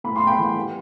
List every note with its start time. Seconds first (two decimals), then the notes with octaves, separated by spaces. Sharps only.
0.04 A2 B5
0.16 C6
0.22 A2
0.27 G5 B5
0.39 E3
0.56 G3